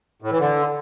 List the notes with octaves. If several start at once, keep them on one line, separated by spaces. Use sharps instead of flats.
A2
E3
D3